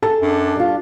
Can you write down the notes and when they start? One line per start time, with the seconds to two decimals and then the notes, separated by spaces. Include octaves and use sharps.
0.02 G#4 A4 A5
0.21 F#2 D4
0.55 G3 F4